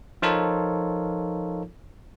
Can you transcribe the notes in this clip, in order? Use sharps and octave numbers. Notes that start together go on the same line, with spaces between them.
F3 D#4 F4 A4 A#4 C#5